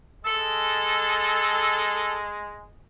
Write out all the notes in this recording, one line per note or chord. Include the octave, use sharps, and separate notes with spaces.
G#3 A4